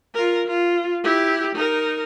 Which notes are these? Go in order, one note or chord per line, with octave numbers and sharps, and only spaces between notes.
F4 A#4
F4
E4 G4
D#4 A#4